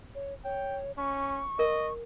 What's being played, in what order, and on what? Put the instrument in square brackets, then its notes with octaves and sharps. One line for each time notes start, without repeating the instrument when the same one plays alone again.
[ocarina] C#5
[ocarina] C#5 [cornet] G5
[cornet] C#4 [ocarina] C#6
[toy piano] A#4 [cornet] D#5